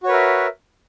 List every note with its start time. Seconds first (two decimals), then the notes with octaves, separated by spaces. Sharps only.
0.03 F#4
0.06 C#5
0.08 B4
0.11 A#4
0.13 E5